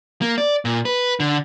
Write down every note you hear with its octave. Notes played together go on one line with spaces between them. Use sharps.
A#3
D5
A#2
B4
D3